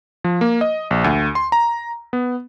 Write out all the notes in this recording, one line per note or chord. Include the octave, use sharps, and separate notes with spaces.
F3
A#3
D#5
A#1
D2
C6
A#5
B3